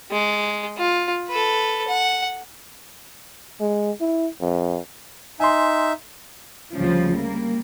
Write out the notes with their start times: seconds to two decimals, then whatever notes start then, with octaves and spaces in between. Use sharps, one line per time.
0.11 G#3
0.78 F4
1.28 A4 B4
1.88 F#5
3.60 G#3
4.01 E4
4.41 F2
5.40 D#4 E5 G#5 C6
6.75 D2 C#3 F3 G3
7.12 G3 A#3